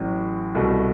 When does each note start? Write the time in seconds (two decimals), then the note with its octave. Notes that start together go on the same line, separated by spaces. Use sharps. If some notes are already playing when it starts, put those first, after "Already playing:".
Already playing: A1 A2 F#3
0.55 C2 B2 A3